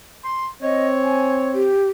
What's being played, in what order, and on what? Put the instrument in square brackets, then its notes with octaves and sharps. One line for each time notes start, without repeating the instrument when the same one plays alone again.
[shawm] C6
[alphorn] C4 [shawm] C#5 [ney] D#5
[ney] G#5
G4